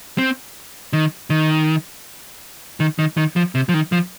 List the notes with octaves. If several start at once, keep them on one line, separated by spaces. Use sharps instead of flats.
C4
D#3
D#3
D#3
D#3
D#3
F3
C3
F3
D#3
F3